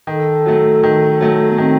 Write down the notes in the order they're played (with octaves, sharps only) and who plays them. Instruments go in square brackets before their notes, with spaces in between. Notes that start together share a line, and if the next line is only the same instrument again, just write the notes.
[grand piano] D#3 [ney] A4
[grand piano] F#3 A3
D#3
F#3 A3
[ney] B3
[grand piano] D#3 [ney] C4